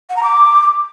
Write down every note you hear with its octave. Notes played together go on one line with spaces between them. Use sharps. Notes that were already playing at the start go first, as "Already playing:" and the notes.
F#5
A#5
D6